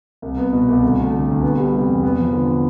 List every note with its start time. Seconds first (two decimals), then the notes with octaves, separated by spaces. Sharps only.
0.22 C2
0.38 B3
0.53 B2
0.68 C2
0.83 D2
0.98 A3
1.13 D3
1.28 D2
1.43 B3
1.58 G3
1.73 C3
1.88 E2
2.03 B3
2.19 F3
2.33 D3